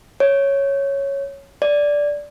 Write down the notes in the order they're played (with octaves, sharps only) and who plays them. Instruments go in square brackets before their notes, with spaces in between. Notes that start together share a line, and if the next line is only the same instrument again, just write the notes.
[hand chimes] C#5
D5